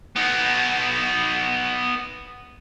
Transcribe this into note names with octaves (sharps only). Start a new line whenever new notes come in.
B3 D#4